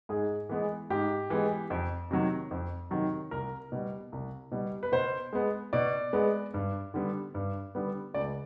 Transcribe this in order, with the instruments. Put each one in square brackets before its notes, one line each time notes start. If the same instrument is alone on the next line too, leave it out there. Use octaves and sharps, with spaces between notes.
[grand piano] G#2 G#4
E3 G#3 B3
G#2 G4
E3 G#3 B3
F2
C3 D#3 F#3
F2
C3 D#3 F#3
C2 A#4
B2 G3
C2
B2 G3
B4
B2 C5
G#3 B3
B2 D5
G#3 B3
G2
D3 G3 B3
G2
D3 G3 B3
C#2 D5